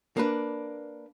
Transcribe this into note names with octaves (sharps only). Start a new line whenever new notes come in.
A#3 D4 B4